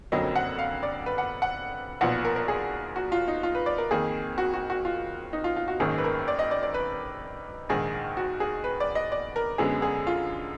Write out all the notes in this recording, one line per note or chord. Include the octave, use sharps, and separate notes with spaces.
F#1 F2 D3 F#3 A#3 D#5
F#5
F5
D5
B4
F#5
F#5
B1 A#2 F3 B3 F#5
A#4
A#4
G#4
F#4
F4
D#4
F4
B4
D5
A#4
F2 D#3 A#3 G#4
F#4
F#4
F#4
F4
D#4
F4
F4
F#4
G#1 F#2 D#3 A#3 G#4
B4
A#4
D5
D#5
D5
D5
B4
A#1 G#2 D#3 G#4
F#4
G#4
B4
D5
D#5
D5
A#4
F#2 D3 G#3 B3 G#4
G#4
F4